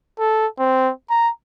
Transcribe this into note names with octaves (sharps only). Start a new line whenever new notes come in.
A4
C4
A#5